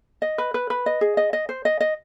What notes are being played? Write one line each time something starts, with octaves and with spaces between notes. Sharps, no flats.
D#5
B4
B4
B4
D#5
G#4
D#5
D#5
C5
D#5
D#5